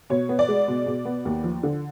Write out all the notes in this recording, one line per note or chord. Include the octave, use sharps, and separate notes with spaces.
B2 C#5
B3
D5
G#3
B2
B2
B3
D#2
F3
D3